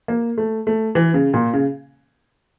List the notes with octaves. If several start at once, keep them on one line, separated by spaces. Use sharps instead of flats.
A#3
A3
A3
E3
C#3
A#2
C#3